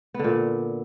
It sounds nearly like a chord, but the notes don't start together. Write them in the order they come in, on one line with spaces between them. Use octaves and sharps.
B3 D3 A#2